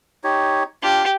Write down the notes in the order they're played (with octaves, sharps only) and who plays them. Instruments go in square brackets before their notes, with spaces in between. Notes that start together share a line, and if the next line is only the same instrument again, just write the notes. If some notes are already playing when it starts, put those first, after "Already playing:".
[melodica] D#4 G4 C#5
[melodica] D4 F4 [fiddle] G4